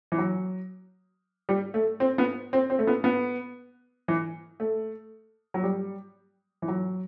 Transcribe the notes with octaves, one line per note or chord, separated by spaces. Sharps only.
E3
F#3
G3
A3
C4
B3
C4
C4
A3
B3
B3
E3
A3
F#3
G3
E3
F#3